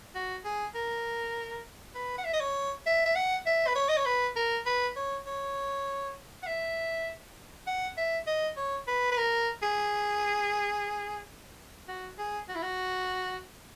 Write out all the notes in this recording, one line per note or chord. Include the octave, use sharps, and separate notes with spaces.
F#4
G#4
A#4
B4
F#5
E5
D#5
C#5
E5
E5
F#5
E5
B4
C#5
D#5
C#5
B4
A#4
B4
C#5
C#5
F#5
E5
F#5
E5
D#5
C#5
B4
B4
A#4
G#4
F#4
G#4
F#4
E4
F#4